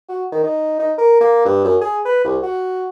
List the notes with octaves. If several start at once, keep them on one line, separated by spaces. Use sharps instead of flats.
F#4
D#3
D#4
D#4
A#4
A#3
G2
F#2
G#4
B4
C2
F#4